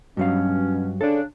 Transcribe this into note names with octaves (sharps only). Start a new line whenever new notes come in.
G2 B2 F#3 C#4 F5
C#3 D4 A4 D5